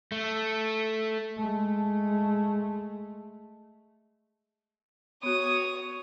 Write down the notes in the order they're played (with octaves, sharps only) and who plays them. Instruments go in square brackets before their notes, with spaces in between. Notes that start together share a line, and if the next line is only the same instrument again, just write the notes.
[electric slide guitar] A3
[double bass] G#3 A3
[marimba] B3 F#4 [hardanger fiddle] C#5 D#6